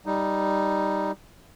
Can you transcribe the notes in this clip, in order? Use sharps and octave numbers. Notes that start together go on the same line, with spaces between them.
G3 D#4